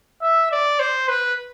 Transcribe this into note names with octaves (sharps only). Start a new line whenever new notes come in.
E5
D5
C5
B4